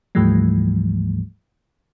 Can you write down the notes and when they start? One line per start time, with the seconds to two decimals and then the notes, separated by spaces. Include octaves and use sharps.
0.15 D2 G#2 E3 F3 G3 A3